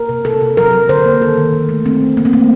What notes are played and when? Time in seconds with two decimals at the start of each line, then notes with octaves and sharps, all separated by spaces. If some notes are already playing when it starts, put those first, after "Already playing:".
Already playing: A#3 A#4
0.09 C3
0.25 C3 A4
0.41 C3
0.57 F#3 A#4
0.73 F#3
0.89 D3 C5
1.05 A#3
1.21 D#3 A4
1.38 D#3
1.53 D#3
1.69 A3
1.86 A3 C4
2.02 A3
2.17 A3 A#3
2.25 C4
2.33 A3 A#3